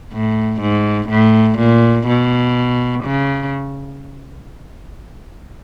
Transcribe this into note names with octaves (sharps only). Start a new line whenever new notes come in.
A2
G#2
A2
A#2
B2
C#3